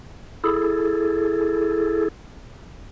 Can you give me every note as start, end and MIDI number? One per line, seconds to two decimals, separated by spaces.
0.44 2.08 64
0.44 2.08 68
0.44 2.08 69